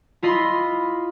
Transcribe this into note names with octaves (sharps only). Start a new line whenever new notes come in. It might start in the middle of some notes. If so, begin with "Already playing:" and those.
E4 F4 D#5 B5 C6